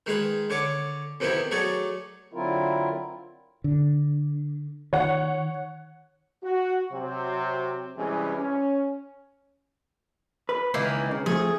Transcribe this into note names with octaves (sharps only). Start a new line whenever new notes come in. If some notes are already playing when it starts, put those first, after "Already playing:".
D#3 G#3 G#4 B4
D3 C#5 D6
F2 C3 D#3 B3 E4
F#3 A3 G#4 C#5 D5
D3 F#3 C4 E4 F4 A#4
D3
D#3 C#5 F#5
F#4
C3 F#3 C4
C3 E3 G3 G#3 C#4 G#4
C#4
B4
C#2 D#3 E3 A#3
C#3
F3 A3 C4 G#4